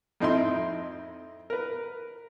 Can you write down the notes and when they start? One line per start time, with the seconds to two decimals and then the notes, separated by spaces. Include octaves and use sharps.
0.20 F2 C4 D#4 E4 C6
1.50 A#4 B4